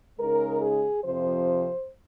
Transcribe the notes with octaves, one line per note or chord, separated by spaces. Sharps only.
C#3 G#3 D#4 A#4
G#4
F2 C3 F3 C5